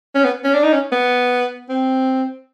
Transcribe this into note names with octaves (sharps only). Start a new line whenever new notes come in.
C#4
B3
C#4
D4
D#4
C#4
B3
C4